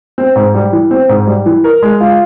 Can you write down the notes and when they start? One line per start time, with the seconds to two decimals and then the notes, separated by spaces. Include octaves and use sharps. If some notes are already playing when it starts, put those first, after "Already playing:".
0.18 C4
0.36 G#2
0.54 G3
0.73 E3
0.91 C4
1.09 G#2
1.27 G3
1.46 E3
1.64 A#4
1.83 G#3
2.01 F4